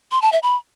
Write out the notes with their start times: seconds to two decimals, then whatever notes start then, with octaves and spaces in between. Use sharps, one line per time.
0.12 C6
0.22 A5
0.32 E5
0.43 B5